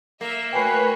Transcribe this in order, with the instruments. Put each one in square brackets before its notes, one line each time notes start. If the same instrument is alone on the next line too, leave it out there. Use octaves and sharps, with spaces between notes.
[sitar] A#3 [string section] E5
[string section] A3 F#4 C#5 [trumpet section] B4 [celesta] G5 G#5 C7